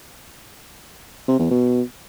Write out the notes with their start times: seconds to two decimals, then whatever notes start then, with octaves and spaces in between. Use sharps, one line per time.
1.28 C3
1.39 E2
1.50 B2